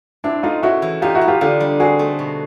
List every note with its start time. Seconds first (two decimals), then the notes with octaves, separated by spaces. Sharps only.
0.24 C4 D4 E4
0.43 A3 D#4 F4
0.63 C#3 E4 F#4
0.82 E3
1.02 D#4 F4 G4
1.15 E4 F#4
1.21 B3
1.28 F4 G4
1.41 D3 F4 G4
1.60 G3
1.79 C4 F#4 G#4
1.99 A3
2.19 B2